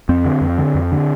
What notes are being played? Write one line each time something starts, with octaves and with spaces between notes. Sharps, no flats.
F2 C4
D3
F2
D3
F2
D3